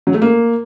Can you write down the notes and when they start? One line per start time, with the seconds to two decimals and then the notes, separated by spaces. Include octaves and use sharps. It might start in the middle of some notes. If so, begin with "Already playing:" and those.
0.07 F#3
0.14 A3
0.22 A#3